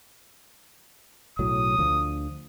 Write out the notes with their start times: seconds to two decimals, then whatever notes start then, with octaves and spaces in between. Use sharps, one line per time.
1.39 B1 A2 F#3 D#6
1.78 D2 D3 F3